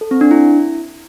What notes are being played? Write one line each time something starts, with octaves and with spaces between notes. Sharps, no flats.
A4
C4
D4
E4